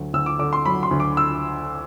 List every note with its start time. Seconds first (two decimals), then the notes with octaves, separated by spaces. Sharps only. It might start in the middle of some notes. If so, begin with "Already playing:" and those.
Already playing: D2 F#3
0.13 D2 E6
0.26 D6
0.39 D3 D6
0.53 C6
0.65 F#3 B5
0.83 C6
0.91 D2
1.00 D6
1.17 E6